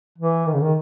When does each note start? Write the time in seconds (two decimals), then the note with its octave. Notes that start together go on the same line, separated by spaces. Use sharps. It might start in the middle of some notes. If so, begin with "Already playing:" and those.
0.18 E3
0.47 D#3
0.54 C#3
0.62 D#3